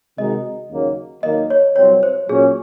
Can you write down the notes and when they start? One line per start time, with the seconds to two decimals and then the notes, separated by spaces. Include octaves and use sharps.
0.18 C3 D#3 G#3 D#4 F#4 D#5
0.70 D#2 C#3 F#3 A#3
1.23 D#2 D#3 F#3 A#3 D#5
1.50 C#5
1.76 C2 C3 F#3 C4 C#5
2.03 C5
2.29 A#2 F#3 C#4 G#4